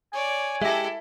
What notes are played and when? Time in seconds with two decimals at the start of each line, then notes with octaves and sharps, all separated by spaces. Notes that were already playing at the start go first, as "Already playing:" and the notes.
0.13 C#5 D5 G#5
0.62 G#3 E4 G4 A4 E5 A#6